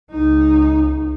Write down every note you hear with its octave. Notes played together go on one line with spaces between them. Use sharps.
C#2 D#4